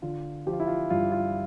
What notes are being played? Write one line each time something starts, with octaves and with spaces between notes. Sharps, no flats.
D3 F4
F3 G4
F4
E4
F4
G2 F4
F4